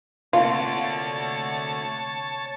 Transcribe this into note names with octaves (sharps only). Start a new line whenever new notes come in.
D2 C3 A#3 F4 C#5 A5